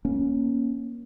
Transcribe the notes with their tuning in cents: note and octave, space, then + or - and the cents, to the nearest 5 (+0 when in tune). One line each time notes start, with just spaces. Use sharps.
A#3 +25 C#4 +0